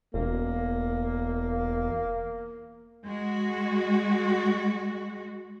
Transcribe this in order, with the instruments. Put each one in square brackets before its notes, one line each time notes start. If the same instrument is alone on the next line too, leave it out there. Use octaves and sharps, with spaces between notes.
[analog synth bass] E1 [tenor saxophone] A#3
[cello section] G#3 F#4